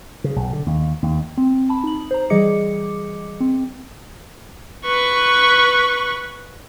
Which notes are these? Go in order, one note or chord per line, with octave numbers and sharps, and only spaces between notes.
C#3
B1
D3
D#2
D#2
C4
A5 B5
D#4 F#7
C5 A#5
E3 G3 G#4 D#5 D6 C#7
C4
B4 C#6